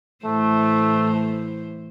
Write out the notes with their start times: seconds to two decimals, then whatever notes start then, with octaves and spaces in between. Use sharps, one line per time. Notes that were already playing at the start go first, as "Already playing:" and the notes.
0.25 A2 E3 A3 C5